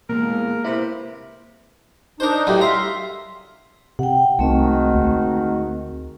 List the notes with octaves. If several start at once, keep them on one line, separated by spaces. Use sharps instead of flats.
B2 G#3 A#3 A#4
C3 E4 B4 C5 B5
D4 D#4 A#4 C5
F#2 A2 G3
E5 F5 A#5 C6
C3 F#5 G5
C2 G#2 D#3 A3 C4 F#4 D#5
D2